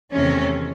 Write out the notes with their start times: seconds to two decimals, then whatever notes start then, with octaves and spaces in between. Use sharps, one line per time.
0.12 E2 C3 D#3 A3 C#4